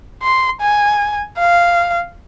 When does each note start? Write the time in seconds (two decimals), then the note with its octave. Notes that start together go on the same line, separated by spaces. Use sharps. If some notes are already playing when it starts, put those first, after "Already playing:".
0.23 C6
0.61 G#5
1.39 F5